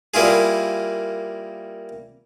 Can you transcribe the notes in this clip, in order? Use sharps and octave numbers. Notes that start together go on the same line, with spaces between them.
G3 A#3 E4 F4 G#4